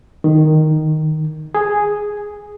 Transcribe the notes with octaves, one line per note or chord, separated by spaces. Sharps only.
D#3
G#4